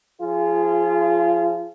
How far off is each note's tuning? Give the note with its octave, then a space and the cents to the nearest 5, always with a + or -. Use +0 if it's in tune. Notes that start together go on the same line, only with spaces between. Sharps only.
F3 +0 F4 -25 G#4 +0